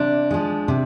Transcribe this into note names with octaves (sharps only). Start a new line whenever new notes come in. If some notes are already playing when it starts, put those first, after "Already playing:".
Already playing: C3 D4
F3 G#3
C3